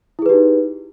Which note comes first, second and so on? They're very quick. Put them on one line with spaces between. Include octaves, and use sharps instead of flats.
E4 G#4 B4 G4 D#4